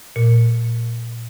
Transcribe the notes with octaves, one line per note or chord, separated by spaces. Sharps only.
A#2